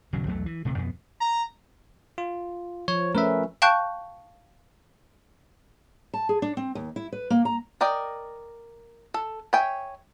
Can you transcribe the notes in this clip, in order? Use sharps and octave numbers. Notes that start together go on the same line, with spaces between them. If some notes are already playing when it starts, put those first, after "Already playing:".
D#1 C#3 F#3
B1 E2 F#3 A3
E3
D#1 C3 A3
F2 B2 B3
A#5
F4
F3 C#5
A3 C#4 A#4 B4 E5
F5 G5 A5 C#6 F#6 G6
A5
G#4
D4
C4
D#2
E4
B4
A#3
A#5
A#4 D5 D#5 G5
A4
C#5 E5 G5 G#5